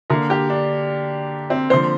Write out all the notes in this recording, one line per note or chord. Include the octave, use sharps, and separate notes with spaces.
D3 A#3 A#4
G4
D4
C4
D3 F3 A#3 C5